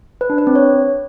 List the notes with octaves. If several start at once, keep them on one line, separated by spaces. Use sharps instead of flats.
B4
D4
B4
C4
C#5